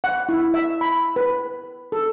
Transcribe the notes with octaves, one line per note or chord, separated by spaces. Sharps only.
F#5
E4
E5
B5
B4
A4